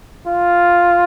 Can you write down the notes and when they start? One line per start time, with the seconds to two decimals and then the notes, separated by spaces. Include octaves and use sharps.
0.27 F4